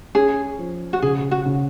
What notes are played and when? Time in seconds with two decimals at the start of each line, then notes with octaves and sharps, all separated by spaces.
0.15 C#4 G#4
0.59 F3
0.93 F#4
1.02 C#3 G#4
1.31 F#4
1.46 C#3